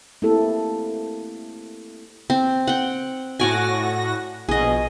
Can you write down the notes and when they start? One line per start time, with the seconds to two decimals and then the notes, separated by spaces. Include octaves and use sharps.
0.22 A3 A#3 C4 E4 G4 A4
2.30 C4
2.67 F#5 G5
3.40 A2 F#4 C#5 D5 G#5 A#6
4.49 A#1 B2 G#4 D#5